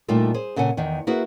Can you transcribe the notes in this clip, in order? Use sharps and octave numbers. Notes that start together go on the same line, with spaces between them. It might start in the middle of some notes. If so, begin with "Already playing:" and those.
A#2 G3 A3 D#4 F4 A4
G#4 C5
A#2 C#3 A4 F#5 G#5
E2 D#3
A#3 E4 F#4 G#4 B4